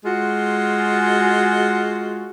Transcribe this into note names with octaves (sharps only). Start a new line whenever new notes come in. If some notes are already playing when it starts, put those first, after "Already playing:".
G#3 F4 F#4